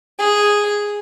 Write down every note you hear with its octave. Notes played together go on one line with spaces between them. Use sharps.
G#4